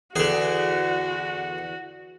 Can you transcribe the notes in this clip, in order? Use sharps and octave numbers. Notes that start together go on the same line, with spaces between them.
E2 D3 F#4 G#4